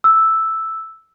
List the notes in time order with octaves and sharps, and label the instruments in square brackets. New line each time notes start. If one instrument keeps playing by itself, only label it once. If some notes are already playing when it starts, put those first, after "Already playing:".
[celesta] E6